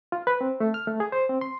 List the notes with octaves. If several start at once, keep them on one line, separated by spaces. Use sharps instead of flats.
F4
B4
C4
A3
F6
A3
G#4
C5
C4
C6